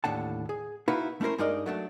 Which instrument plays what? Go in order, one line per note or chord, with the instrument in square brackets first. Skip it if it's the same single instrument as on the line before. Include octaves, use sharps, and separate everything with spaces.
[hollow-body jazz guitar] D#2 A2 D3 F#5 A5
G#4
D#4 E4 F#4 B4 F5
A3 C#4 E4 A#4 C5
G2 G#3 D#4 A#4 D5 D#5
F#3 A3 D4